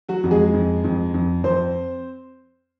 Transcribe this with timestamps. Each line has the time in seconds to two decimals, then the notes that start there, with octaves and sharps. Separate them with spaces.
0.09 F#3 F#4
0.24 F2
0.31 G#3 G#4
0.53 F2
0.84 F2
1.14 F2
1.44 F2 C4 C5